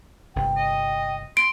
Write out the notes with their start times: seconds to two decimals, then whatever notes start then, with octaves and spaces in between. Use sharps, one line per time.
0.36 G1 C3 G5
0.57 D#5
1.37 C6 D7